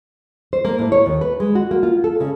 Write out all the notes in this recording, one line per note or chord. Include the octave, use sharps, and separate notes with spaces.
C5
A#3
A2
C#5
D#2
B4
G#3
F#4
A#3
F4
A4
C#3